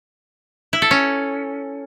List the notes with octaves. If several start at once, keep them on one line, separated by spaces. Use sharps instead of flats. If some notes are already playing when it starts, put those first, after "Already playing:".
E4
A4
C#4